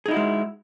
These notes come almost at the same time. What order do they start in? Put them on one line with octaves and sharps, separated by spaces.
G#4 D#4 E4 F#4 G#3